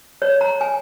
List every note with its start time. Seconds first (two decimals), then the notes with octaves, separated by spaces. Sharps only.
0.22 C#5
0.41 A#5
0.61 G#5